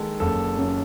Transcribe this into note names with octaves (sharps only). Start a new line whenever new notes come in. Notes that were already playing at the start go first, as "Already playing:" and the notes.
Already playing: D#3 G#3 A4
F#1 A4
F#2